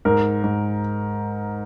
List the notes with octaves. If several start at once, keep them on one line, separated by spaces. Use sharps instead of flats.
G#2 A#4
G#2